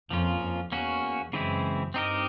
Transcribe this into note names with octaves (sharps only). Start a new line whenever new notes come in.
F2 F3 A#3 C#4 F4
F2
E2 A#3 C#4 F#4
F#2 C#3 E3 G#3 C4 E4
G2 C4 D#4 G4 A#4 D#5